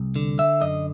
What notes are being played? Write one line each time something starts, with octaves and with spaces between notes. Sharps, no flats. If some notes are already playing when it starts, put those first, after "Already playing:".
Already playing: C2
D3
E5
F#2 D#5